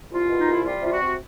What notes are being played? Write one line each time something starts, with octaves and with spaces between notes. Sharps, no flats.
C2 F4
B2
D#4
C2
E4
G3 F4
C3 F4
F#4
C3